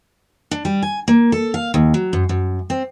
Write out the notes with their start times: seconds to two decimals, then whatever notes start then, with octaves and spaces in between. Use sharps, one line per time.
0.51 D4
0.65 G3
0.82 G#5
1.08 A#3
1.32 A4
1.54 F5
1.74 D#2
1.94 F#3
2.13 F#2
2.29 F#2
2.70 C4